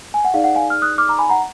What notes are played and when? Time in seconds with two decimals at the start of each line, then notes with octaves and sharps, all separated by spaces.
0.14 G#5
0.25 F#5
0.34 D#4 G#4 D5 F5
0.44 F#5
0.55 F5 G#5
0.70 F6
0.82 D#6 F#6
0.98 D6 F6
1.08 A#5 D6
1.19 G#5 B5
1.29 F#5 A#5